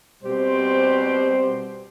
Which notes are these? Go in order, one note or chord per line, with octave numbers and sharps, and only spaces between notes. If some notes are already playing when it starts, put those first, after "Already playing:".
B2 G3 C4 G4 C5